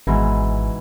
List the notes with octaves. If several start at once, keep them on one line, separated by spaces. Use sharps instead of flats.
G#1 G#2 B2 E3